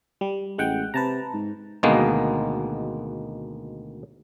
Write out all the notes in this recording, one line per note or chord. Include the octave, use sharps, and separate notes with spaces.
G3
A1 G#3 F#5 G5
C3 B4 A5 A#5
G#2
D2 B2 D#3 G#3 A#3 B3